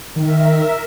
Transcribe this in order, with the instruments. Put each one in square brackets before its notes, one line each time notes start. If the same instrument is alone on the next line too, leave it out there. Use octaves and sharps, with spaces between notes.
[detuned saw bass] D#3 [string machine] A#4 E5